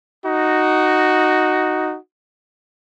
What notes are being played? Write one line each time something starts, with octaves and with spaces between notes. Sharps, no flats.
D#4 F#4